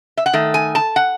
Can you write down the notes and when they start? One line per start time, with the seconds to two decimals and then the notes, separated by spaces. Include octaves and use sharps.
0.17 E5
0.26 F#5
0.33 D#3 A3
0.54 G#5
0.75 A5
0.96 F#5